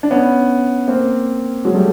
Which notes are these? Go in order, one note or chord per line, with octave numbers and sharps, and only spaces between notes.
D4
B3 C#4
A#3 C4
F#3 G#3
G3 A3